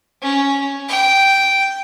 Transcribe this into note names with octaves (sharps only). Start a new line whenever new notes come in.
C#4
G5